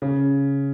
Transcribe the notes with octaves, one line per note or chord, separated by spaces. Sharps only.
C#3